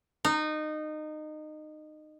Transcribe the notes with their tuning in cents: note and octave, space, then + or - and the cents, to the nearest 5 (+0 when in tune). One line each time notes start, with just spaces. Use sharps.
D#4 -20